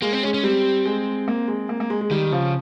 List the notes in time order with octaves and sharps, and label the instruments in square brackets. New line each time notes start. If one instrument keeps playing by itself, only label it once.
[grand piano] G#3 [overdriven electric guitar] A#3
[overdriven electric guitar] C4
[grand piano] G#3 [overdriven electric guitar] C#4
[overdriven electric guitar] C#4
[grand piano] G3 [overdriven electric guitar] C4
[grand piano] G#3
A#3
G#3
A#3
A#3
G#3
G#3
[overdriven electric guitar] D#3 [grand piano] G3
[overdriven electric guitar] C#3 [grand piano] F3